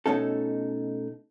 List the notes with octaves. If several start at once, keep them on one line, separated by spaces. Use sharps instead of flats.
B2 A3 C#4 D#4 A4